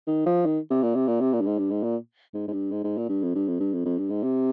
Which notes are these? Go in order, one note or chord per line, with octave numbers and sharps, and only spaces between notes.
D#3
F3
D#3
C3
A#2
C3
A#2
C3
A#2
G2
G#2
G2
G#2
A#2
G#2
G#2
G2
G#2
G#2
A#2
G2
F2
G2
F2
G2
F2
F2
G2
G#2
C3